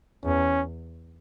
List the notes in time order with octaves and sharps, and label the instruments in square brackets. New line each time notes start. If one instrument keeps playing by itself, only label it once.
[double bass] E2 [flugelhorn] C#4